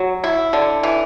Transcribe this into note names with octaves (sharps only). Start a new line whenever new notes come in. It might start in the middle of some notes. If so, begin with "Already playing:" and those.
Already playing: F#3
E4
D3
E3